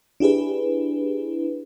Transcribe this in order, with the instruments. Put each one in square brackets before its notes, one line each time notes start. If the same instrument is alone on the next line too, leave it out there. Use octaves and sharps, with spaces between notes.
[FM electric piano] D4 E4 G4 G#4 B4